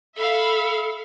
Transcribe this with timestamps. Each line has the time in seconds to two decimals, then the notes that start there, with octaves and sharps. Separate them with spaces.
0.16 A4 E5 F5 B5